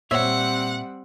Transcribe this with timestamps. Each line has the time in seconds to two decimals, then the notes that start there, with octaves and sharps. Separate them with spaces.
0.11 A#2 G3 C4 C5 C#5 E5 F#5